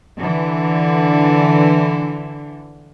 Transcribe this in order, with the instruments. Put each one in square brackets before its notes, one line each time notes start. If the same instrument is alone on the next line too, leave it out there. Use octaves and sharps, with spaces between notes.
[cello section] D3 E3